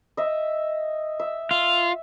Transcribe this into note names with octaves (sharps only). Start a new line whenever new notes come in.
D#5 E5
E5
F4